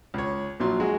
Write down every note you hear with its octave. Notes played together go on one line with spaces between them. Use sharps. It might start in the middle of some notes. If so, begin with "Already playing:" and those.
C#2 C#5
A#1 A#2 F#3 C6
G#3 F#4 G#4